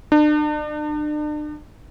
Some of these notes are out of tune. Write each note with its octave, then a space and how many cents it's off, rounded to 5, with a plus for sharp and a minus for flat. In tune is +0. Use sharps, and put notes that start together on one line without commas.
D4 +40